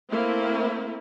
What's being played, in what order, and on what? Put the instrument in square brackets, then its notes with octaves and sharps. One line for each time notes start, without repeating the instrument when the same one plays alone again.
[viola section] A3 A#3 C4 E4